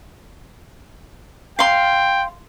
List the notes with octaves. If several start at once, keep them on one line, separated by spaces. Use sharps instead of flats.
F5 G5 C6